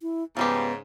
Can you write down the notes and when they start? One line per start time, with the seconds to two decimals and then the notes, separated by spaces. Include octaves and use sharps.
0.02 E4
0.37 G#2 C#3 F3 G3 B3 G4